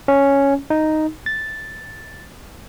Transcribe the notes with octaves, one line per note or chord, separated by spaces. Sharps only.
C#4
D#4
A6